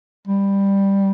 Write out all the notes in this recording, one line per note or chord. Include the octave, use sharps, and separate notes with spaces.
G3